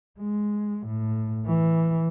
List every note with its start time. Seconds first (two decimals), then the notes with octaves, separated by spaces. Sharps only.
0.19 G#3
0.86 A2
1.45 E3